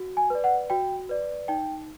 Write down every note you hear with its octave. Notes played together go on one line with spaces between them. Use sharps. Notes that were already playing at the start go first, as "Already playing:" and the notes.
Already playing: F#4
G#5
B4 D5
F#5
F#4 G5
B4 D5
D#4 G5